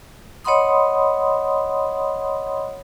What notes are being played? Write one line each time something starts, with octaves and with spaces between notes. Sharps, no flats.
C#5 D#5 F#5 B5 C6 D#6